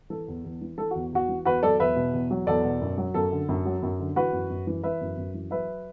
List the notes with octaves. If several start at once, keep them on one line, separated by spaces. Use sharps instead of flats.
E3 A4
E2
E2
E3
E3 A4
E2 F#4
E2 F#4
E3
E2 F#4 B4
F#3 A4 D5
E2 B4 E5
B2
E2
F#3
E2 A4 D5
B2
F#2
F#3
F#2 A4
D3
F#2
F#3
F#2
D3
E3 F#4 B4
F#2
F#2
E3
E3 B4 E5
F#2
F#2
E3
F#3 B4 E5